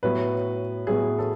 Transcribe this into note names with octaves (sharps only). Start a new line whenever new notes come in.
A2 F#3 B3 B4
A2 F#3 B3 G#4
A4